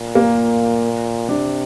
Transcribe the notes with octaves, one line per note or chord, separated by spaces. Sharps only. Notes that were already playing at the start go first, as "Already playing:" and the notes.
Already playing: A#2
A#3
C3 D4